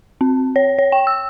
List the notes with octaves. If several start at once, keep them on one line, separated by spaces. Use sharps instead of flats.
C4
C#5
C#5
G5
E6